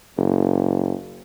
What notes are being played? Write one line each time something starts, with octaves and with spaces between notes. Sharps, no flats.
F#1